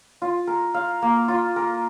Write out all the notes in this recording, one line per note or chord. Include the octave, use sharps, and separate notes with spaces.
F4
A#4
F5
A#3
F4
A#4